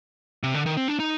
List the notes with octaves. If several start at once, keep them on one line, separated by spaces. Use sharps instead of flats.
C3
D3
D#3
C4
D4
D#4